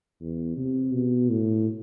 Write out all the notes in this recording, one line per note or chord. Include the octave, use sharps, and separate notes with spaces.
E2
C3
B2
A2